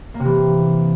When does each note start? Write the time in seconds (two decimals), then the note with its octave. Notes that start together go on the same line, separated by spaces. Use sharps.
0.14 A#3
0.20 C3
0.25 E3